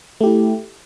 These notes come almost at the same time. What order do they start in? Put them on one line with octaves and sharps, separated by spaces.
A3 G4 E4